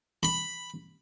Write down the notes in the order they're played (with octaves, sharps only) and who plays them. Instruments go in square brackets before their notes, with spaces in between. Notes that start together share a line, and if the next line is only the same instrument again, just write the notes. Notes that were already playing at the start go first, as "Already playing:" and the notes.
[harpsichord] B5